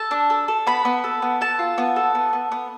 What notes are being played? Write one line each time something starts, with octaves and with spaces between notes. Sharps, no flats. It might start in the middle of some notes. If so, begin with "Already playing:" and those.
Already playing: A4 A5
D4
A4
A4
B3 B5
B3
A4
B3
A4 A5
F4
B3
A4
B3
B3
B3